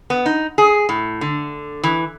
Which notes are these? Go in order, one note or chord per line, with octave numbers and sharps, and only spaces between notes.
B3
D#4
G#4
A2
D3
E3